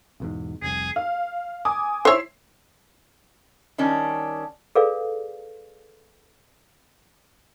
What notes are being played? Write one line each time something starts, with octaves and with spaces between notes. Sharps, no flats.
B1 E2 G#2
F1 C2 G#4
F5
G#5 D6 D#6
E4 C5 C#5 E6 C7
D#3 G3 C#4 D4
G#4 A4 B4 D5 F5